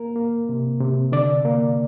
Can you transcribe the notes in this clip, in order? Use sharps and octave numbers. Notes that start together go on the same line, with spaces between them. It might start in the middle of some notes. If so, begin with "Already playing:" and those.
Already playing: A#3 A#4
A#3
C3
C3
D3 D5
A#3